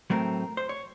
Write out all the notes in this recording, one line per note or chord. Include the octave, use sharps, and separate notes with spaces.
A2 F#3 A3 C4 A#4
C5
C#5